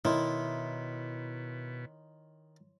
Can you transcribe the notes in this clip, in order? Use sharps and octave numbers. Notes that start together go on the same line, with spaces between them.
B2 D#3 E4 C#5 C6